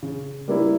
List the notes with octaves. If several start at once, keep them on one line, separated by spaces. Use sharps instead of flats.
C#3
G3 A#3 E4